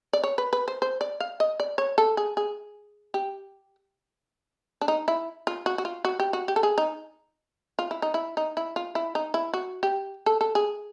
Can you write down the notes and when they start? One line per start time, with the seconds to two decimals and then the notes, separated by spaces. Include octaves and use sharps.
0.13 D5
0.23 C#5
0.38 B4
0.53 B4
0.68 C5
0.82 C5
1.01 D5
1.20 F5
1.40 D#5
1.60 D5
1.78 C#5
1.98 A4
2.17 G#4
2.37 G#4
3.14 G4
4.81 D4
4.88 D#4
5.08 E4
5.47 F4
5.66 F#4
5.78 F#4
5.85 F4
6.05 F#4
6.20 G4
6.33 F#4
6.48 G4
6.56 A4
6.63 G#4
6.78 D#4
7.79 F4
7.91 E4
8.02 D#4
8.14 E4
8.37 D#4
8.57 E4
8.76 F4
8.95 E4
9.15 D#4
9.34 E4
9.53 F#4
9.83 G4
10.26 A4
10.41 A4
10.55 G#4